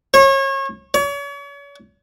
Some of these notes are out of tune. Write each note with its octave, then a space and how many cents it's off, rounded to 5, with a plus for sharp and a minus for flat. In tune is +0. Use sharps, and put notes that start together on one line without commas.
C#5 -30
C#5 +40